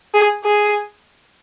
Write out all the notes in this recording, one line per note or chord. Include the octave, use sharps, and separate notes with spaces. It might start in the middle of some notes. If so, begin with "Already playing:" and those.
G#4
G#4